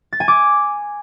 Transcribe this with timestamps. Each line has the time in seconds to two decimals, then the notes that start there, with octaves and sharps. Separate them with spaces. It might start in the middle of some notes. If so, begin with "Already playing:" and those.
0.13 A6
0.20 G#5
0.28 D6